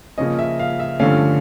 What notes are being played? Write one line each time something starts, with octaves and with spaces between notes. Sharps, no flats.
C#3 F3 A#3 C#4 D#5
E5
F5
E5
G2 D3 F3 A3 C#4 F5